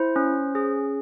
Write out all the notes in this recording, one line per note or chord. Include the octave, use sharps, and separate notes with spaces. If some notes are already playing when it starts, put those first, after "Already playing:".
Already playing: E4 C5
C#4
G#4